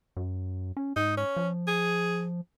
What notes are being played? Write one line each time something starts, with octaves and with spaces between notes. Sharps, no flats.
F#2
C#4
G#2 D#4
C#4
F3
G#4